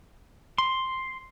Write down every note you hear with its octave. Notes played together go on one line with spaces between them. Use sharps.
C6